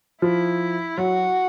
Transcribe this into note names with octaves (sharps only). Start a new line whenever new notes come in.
F3 E4
F#3 F#4